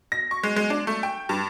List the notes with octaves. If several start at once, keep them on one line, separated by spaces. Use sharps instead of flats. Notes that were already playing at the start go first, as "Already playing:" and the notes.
A#6
C#6
G#3
G#3
D4
A3
G5
G2